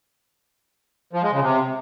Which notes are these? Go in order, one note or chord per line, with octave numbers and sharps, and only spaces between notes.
F3
G#3
C#3
C3